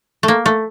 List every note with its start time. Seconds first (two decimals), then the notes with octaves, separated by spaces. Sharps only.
0.23 A3
0.28 A#3
0.46 A3